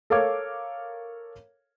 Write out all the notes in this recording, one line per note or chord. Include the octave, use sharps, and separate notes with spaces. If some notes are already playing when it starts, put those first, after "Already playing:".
A4 A#4 C#5 F5 D6 G#6